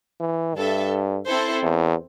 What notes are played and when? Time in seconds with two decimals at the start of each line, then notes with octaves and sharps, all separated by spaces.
0.20 E3
0.56 G2 D4 A4 E5
1.27 C4 E4 A4 C5
1.63 E2